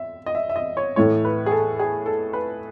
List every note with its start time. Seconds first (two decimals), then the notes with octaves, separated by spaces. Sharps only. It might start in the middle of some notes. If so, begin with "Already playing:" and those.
Already playing: E5
0.26 D#5
0.35 E5
0.50 E5
0.56 D#5
0.77 C#5
0.96 A2 E3 A3 C#5
1.25 B4
1.46 G#4
1.51 A4
1.79 G#4
2.06 A4
2.33 B4